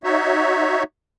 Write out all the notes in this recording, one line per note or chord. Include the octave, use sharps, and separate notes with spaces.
D#4 F#4 C#5 E5